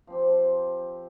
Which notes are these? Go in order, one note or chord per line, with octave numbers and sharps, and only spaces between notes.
F3 C4 G4